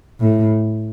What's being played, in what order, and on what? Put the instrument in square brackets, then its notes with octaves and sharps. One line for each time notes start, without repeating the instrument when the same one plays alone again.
[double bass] A2